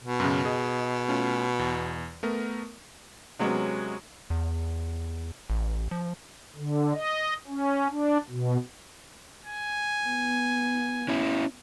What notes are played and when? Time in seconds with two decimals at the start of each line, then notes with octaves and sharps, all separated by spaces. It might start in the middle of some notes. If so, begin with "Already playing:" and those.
0.03 B2
0.20 F#2 C#3
0.45 G#4 D#5
1.08 A3 C#4 F4
1.59 E2
2.23 A3 B3 A#4
3.39 C3 F#3 G#3 B3 C#4
4.30 E2
5.50 A1
5.91 F3
6.56 D3
6.95 D#5
7.47 C#4
7.91 D4
8.30 B2
9.46 G#5
10.06 B3
11.09 C#4 E4